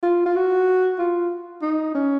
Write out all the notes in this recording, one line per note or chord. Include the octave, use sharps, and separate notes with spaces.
F4
F4
F#4
F4
D#4
C#4